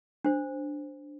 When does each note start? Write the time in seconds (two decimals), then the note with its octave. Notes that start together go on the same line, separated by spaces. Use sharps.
0.25 D4 C5